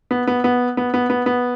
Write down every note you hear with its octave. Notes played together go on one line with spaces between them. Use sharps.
B3
B3
B3
B3
B3
B3
B3